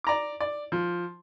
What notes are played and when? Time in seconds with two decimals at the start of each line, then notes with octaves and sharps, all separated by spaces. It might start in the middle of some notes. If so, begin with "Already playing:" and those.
0.04 D5 A#5 D6
0.40 D5
0.72 F3